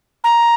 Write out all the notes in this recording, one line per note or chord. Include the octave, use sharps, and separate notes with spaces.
A#5